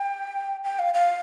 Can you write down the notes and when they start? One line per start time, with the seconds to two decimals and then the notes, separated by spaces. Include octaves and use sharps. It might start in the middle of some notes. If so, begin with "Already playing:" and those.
Already playing: G5
0.64 G5
0.79 F5
0.94 F5